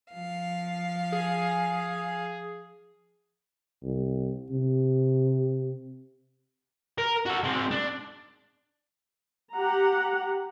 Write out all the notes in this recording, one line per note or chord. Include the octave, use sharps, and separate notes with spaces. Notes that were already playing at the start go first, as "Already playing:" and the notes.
F3 F5
G#4
C2
C3
A#4
F#4 A4
G#3 C4
D4
G4 F#5 A#5